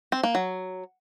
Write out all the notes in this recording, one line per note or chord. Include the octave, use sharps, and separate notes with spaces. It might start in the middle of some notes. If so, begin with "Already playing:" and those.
C4
A#3
F#3